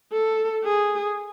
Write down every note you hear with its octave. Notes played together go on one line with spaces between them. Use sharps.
A4
G#4